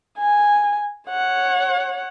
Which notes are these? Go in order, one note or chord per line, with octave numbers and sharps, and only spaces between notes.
G#5
C#5 F#5